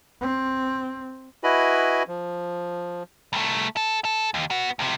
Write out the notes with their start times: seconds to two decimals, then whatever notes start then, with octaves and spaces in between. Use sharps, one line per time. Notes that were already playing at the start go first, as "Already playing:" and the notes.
0.21 C4
1.44 E4 F#4 B4 D#5 G#5 B5
2.08 F3
3.33 C2 A3
3.77 A4
4.05 A4
4.34 D#2
4.51 B3 F#4
4.79 C#2 C3